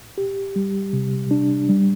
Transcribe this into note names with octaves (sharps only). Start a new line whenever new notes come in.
G4
G3
C3
D4
G3